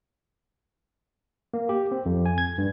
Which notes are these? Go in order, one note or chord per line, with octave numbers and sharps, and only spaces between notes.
A#3
G4
C4
F2
G#5
G#6
G2